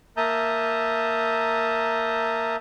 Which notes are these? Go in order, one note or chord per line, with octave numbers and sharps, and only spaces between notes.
A#3 E5 A5 A#5 D#6 G6